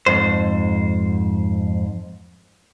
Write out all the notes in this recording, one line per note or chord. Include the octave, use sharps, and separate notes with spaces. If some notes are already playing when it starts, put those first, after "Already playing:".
F2 G#2 C5